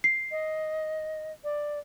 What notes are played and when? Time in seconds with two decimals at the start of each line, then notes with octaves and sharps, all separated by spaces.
0.04 C7
0.31 D#5
1.44 D5